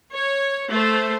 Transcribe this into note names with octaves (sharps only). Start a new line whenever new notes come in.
C#5
A3 C5